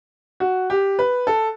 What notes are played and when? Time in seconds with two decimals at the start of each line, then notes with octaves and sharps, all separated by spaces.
0.40 F#4
0.70 G4
0.99 B4
1.27 A4